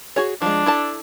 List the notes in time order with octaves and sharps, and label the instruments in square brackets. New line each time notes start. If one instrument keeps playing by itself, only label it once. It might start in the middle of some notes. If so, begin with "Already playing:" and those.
[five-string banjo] F#4 G#4 C#5
[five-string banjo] F3 G#3 [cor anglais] D4
[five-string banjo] E4 A4 A5